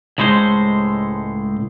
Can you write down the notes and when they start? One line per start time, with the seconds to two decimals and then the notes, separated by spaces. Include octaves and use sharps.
0.18 C#2 A2 G#3 A4 C5